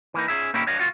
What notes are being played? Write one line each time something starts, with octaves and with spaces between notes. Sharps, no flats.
E3 A#3 D#4
C#4 G#4 E5
A#2 A#3 C#4 D#4 E4 G4
D4 C#5 D#5 F5
C2 G#2 F4 F#4